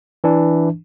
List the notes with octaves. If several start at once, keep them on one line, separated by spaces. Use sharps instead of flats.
E3 D4